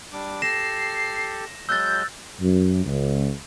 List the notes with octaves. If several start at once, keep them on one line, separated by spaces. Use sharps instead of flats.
G3 D4 D6
G4 A4 A#6 C7 E7
F#3 G#3 E6 F#6 G6 A6
F#2
C#2